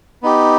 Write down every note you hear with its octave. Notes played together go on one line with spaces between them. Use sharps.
B3 D#4 G4